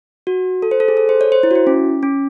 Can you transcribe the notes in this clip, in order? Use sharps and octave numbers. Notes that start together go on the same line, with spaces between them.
F#4
A4
C5
A4
G#4
A4
C5
C#5
C5
E4
F#4
E4
C#4
C#4